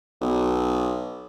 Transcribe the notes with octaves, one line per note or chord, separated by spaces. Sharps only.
B1